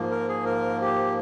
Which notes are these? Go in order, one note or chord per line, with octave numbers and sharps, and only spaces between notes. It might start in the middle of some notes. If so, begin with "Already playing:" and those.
Already playing: G#2 F3 A#3
A#4
G#4
A#4
G4